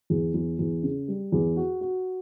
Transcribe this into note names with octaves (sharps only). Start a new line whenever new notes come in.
E2
E2
E2
C#3
G3
E2
F#4
F#4